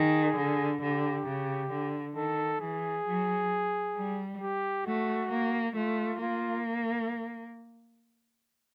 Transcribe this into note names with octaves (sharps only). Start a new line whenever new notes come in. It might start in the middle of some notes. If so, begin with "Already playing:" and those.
Already playing: D#3 G#4
D3
D3 G4
C#3
D3
D#3 A4
E3 G#4
F#3
G3
G4
A3 F#4
A#3
A3 F4
A#3 F4